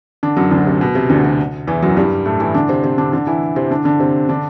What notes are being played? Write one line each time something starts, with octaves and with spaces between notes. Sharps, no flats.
D3 D4
F#2 F#3
D2 D3
C3
B2
C3
D2 D3
C3
E2 E3
F#2 F#3
G2 G3
A2 A3
E3 E4
D3 D4
C3 C4
C3 C4
D3 D4
D3 D4
E3 E4
C3 C4
D3 D4
D3 D4
C3 C4
D3 D4